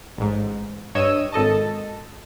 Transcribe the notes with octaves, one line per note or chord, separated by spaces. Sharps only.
A1 G#2
G2 C#5 D#5 E6 D#7
G#1 A4 D#5 A5